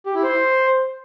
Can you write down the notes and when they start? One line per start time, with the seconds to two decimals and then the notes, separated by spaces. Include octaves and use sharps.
0.06 G4
0.15 E4
0.23 C5